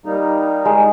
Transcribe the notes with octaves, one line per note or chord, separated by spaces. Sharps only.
G3 A#3 D#4
G#3